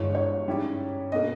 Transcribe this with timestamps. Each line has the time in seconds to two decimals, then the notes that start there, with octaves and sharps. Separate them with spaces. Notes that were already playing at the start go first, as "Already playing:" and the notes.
Already playing: G1 G2 E3 G#3 C#5
0.15 C#5
0.48 G#2 G3 C#4 E4
1.12 B2 A#3 D#5